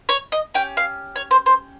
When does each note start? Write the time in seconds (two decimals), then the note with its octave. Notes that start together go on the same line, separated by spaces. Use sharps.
0.09 C#5
0.32 D#5
0.54 C#4 G4 G5
0.77 F5
1.16 C#5
1.31 C5
1.46 C5